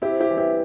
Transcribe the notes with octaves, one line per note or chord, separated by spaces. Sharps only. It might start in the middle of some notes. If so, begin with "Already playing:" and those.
C3 E4 G4
E4 G4
E3 G3
E4 G4